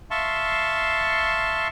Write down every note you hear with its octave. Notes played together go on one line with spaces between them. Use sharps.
E5 F5 A5 C6 C#6